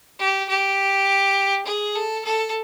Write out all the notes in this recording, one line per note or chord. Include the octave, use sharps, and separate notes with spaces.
G4
G4
G#4
A4
A4